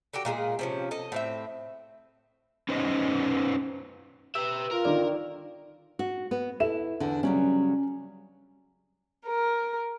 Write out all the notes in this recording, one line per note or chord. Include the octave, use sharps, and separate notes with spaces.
D3 F#4 G4 G5
A#2 G#3 G4 G#4
C3 F3 C#4
A4 D#5
A2 C4 E5
C#4 D#4 B4 C5 D#5
G4 B4 E5 E6
F4 A#4
D3 D#3 D#4 D5
F#4
B3
E4 A4 E5 E7
E2 D3
C#3 F#3 G3 C#4
A#4